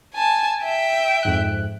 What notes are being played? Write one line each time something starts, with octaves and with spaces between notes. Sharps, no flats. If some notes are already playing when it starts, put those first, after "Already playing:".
G#5 A5
E5 G5
F2 G#2 F#6